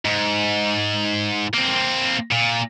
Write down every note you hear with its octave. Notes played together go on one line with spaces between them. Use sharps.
G#2
A#3 C4
A#2